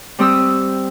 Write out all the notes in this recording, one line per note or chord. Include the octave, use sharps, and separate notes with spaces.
G3 C4 G4 D#6 E6